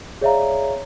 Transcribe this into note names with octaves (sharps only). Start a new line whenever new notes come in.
G#4 C#5 D5 E5 F5 A#5